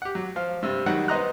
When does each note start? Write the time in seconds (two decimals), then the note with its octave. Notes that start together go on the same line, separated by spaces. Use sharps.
0.02 G4 F#5
0.15 F#3
0.36 F3 F5
0.62 G2 C3 G3
0.86 D#3 F#3 G3 F#4 F#5
1.08 B3 D#4 C5 D#5 A#5 F#6